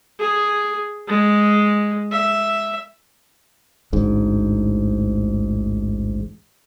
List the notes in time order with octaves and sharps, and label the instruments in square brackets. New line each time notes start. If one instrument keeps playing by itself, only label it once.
[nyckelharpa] G#4
G#3
E5
[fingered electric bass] A1 D2 G#2